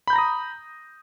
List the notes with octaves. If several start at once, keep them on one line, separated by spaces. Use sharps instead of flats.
A#5 B5 D#6 G6 A#6